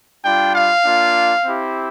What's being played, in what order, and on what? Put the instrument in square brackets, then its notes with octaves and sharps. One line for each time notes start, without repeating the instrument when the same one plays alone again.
[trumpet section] G3 D4 F4 G5
F5
A#3 D4 F4
C4 E4 G4